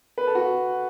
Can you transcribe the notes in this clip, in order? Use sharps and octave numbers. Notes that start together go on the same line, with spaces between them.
B4
A4
F#4